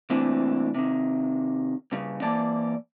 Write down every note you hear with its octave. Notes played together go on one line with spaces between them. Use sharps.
C3 E3 A3 A#3 C4 D4
C3 D#3
G2 C#3
E3 A#3 D5 A5